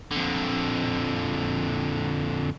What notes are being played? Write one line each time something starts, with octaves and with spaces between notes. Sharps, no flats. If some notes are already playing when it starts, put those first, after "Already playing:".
F2 D3